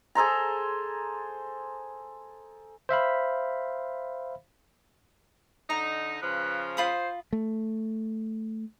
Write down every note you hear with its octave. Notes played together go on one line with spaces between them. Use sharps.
G#4 A4 C5 A#5
C5 E5 F5 B5
D3 D#4 A#5
C#3 F3 B4
F4 C5 B5 D#6
A3